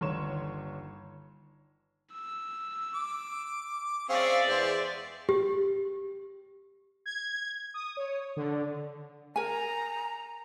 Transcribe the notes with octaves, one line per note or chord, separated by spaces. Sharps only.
G1 D#2 C#5 C6 E7
E6
D6
C4 C#4 G#4 D5 E5 F5
E2 G#3 C5
G4
G#6
D#6
C#5
D3
A#4 G#5 A#5